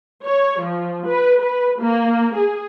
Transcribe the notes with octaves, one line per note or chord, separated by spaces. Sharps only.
C#5
F3
B4
B4
A#3
G#4